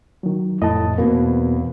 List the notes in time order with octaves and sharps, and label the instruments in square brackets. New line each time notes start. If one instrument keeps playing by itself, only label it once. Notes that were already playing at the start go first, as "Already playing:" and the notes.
[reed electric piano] D#3 F#3
[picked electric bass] F1 [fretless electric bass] A2 [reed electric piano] D#5 A5
[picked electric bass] E2 [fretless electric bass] B2 A#3 [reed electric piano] C4